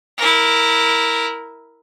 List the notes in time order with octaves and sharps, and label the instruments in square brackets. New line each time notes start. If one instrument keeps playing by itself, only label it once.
[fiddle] E4 A#4